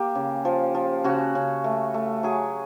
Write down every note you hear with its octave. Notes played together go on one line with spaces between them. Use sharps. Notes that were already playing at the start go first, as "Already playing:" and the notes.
Already playing: A#3 G4
C#3
F3
F3
C#3 F#4
C#3
A3
A3
F#3 G#4